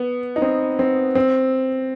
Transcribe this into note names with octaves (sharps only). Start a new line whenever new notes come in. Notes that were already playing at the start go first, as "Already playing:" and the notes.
Already playing: B3
D#4
C4
C4
C4